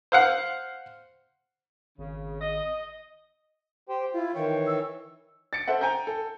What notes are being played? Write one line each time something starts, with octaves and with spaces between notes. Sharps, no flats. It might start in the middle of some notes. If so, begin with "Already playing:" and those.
C5 F5 F#5
G#1 C#3
D#5
G4 C5 G5
E4 F4
D#3 E3 C#5 G5
E6
A6 C#7 D7
A4 C5 E5 F#5
G5 G#5 A#5 G6
A4